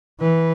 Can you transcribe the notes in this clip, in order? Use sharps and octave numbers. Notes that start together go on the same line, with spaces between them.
E3 B4